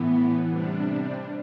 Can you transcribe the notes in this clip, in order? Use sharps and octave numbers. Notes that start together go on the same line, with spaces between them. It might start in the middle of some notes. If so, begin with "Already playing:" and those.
Already playing: A2 E3 B3
C3 G3 D4